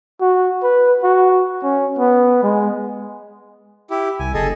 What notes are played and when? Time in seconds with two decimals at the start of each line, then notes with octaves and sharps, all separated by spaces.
0.21 F#4
0.63 B4
1.03 F#4
1.63 C#4
1.99 B3
2.43 G#3
3.90 E4 G4
4.20 C2 G#5
4.34 F#1 G#4 A4 D#5